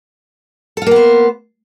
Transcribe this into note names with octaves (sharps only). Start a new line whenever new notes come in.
A#3 B3 F4 A4 C5